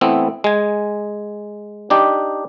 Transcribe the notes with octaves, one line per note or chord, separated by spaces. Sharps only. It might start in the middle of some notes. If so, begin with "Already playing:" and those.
E3 A3 B3 C4 E4
G#3 G#5
D4 D#4 G4